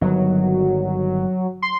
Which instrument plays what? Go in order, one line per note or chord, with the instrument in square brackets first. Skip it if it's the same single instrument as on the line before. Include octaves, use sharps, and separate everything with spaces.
[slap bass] G1 D#3 [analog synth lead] F#3
[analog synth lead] C6